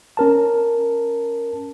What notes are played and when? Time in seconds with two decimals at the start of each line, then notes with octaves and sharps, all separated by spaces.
0.17 C#4 A#4 A5